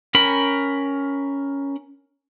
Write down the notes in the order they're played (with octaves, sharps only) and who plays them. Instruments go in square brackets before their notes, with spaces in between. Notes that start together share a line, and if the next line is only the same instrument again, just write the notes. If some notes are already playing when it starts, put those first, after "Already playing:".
[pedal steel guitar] C#4 A#4 G5 B5